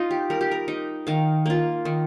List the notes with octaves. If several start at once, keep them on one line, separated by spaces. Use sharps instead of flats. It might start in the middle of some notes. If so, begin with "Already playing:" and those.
Already playing: D#4 F4
G4
G3 A#4
G4
A#4
D#4
D#3 F5
A#3 F4
D#3